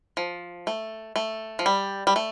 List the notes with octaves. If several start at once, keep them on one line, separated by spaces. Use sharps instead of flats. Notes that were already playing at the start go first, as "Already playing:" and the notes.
F3
A3
A3
F3
G3
G3
A3